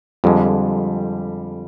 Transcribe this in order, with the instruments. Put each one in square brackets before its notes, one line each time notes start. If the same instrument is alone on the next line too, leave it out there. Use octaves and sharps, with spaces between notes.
[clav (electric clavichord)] F2 D3 G#3 [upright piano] G3